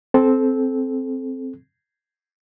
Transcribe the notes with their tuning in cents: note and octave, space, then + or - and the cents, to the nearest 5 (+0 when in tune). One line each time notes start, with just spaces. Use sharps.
C4 +0 A4 -20